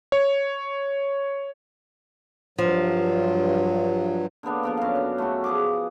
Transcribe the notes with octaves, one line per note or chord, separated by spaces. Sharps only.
C#5
G2 F3 F#3
D3 A#3 B3 D4
F3 B3 A#4
F#2 F5
C#4
A3 E4 F#4
F3 G#4 D6